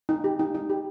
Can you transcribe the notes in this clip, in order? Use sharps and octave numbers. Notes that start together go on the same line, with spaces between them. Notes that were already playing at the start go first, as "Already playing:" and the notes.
D#4
G4
D#4
D#4
G4